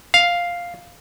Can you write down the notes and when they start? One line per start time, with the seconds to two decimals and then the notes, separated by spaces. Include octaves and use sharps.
0.14 F5